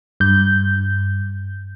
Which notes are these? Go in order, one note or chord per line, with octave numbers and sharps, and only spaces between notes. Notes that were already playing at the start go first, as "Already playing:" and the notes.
G2 G6